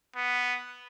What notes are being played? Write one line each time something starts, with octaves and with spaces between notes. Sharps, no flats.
B3